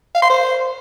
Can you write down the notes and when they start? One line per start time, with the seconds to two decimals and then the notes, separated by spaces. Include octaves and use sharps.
0.15 F5
0.22 C6
0.30 C5